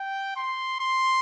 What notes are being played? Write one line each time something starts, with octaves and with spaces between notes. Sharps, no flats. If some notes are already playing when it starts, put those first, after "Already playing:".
Already playing: G5
C6
C6